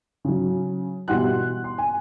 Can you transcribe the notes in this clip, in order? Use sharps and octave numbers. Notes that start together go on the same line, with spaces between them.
C#3 F#3
B2 E3 G3 F#5 C6 F#6
C6
G#5